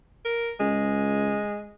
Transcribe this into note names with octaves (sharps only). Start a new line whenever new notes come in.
A#4
C#2 G#3